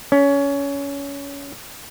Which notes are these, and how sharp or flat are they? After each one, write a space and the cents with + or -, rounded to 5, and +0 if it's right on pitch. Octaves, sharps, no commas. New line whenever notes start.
C#4 +20